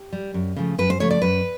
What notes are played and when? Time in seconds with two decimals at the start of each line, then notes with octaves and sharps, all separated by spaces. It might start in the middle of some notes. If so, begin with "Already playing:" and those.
Already playing: G4
0.13 G3
0.34 F#2
0.56 C#3 F3 A3
0.78 F#2 B4
0.90 C5
1.00 C#3 F3 A3 C#5
1.11 D5
1.22 F#2 B4